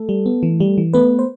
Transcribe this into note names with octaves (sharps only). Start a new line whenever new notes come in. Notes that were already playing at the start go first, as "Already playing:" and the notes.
Already playing: A3 A4
G3
B3
E3
G3
E3
A3 B3 B4
C5